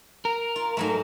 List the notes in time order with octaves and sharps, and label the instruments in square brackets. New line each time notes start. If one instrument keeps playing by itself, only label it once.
[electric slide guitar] A#4
[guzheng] F4
G#2 F#3 A3